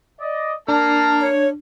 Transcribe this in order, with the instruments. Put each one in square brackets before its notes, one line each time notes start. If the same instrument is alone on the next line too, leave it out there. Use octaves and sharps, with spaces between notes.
[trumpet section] D5 D#5
[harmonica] A#3 A#5 F6 [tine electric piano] D4 [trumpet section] A5
[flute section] C#5